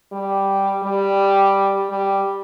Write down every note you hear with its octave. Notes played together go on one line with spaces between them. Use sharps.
G3
G3
G3